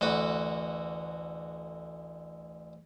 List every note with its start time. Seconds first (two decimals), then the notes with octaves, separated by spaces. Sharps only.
0.01 A1 D2 F#4 B4